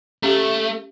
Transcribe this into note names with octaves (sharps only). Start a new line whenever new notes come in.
A3 C#4 G4 F5